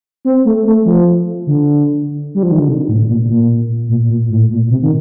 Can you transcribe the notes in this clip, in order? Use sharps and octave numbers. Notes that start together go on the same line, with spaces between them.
C4
A3
A3
F3
D3
G3
F3
D#3
D3
C3
A2
A#2
A#2
A#2
A#2
A2
A#2
C3
D#3